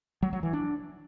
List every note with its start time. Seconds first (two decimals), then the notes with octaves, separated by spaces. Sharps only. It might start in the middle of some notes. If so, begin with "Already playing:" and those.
0.22 F#3
0.33 F#3
0.43 E3
0.53 D4